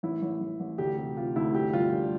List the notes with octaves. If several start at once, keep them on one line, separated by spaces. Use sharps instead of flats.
A1 E4
A1
A1
A1
D2 G4
C3
C3 F4
D2 E4
G2 G4
G1 F4
G2